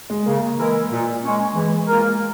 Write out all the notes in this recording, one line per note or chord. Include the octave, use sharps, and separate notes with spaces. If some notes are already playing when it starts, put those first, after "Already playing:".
G#3
C#3 A#3
E3 G#3 E4 A#4
A#2
G#3 C#4
E3 G#3
A#3 F4 A#4